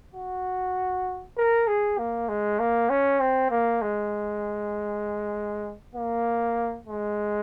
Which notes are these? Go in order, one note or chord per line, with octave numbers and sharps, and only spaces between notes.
F#4
A#4
G#4
A#3
G#3
A#3
C#4
C4
A#3
G#3
A#3
G#3